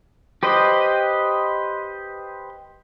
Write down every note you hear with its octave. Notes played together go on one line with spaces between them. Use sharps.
G4 B4 C5 D#5